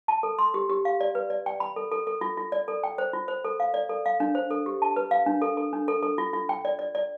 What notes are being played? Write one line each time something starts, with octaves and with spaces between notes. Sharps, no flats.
A5
A4
C6
G4
G4
F5
D5
B4
D5
G5
B5
A4
A4
A4
F4
F4
D5
A4
G5
C5
F4
C5
A4
F5
D5
A4
F5
D4
C5
A4
G4
A5
B4
F5
D4
A4
A4
D4
A4
A4
F4
F4
G5
D5
D5
D5